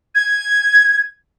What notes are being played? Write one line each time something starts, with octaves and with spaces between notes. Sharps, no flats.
G#6